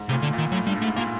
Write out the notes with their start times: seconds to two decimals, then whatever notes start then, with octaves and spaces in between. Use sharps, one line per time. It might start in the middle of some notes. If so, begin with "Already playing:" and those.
Already playing: G#2
0.09 A2 C3
0.13 A#2
0.22 D3
0.33 A#2
0.38 D#3
0.52 A2 F#3
0.67 G2 G3
0.81 G#2 A3
0.96 A#2 A#3